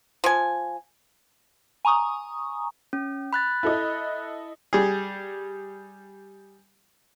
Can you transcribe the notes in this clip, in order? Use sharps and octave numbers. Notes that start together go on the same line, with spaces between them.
F3 G#5
G#5 A#5 C#6 D#6
C#4
B5 F#6 A6
E4 A4 D#5
G3 G#4